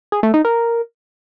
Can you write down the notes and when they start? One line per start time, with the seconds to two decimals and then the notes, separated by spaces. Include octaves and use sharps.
0.12 G#4
0.23 A3
0.34 D#4
0.45 A#4